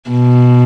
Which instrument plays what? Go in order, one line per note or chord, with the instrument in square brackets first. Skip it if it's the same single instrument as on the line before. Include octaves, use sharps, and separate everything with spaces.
[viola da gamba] B2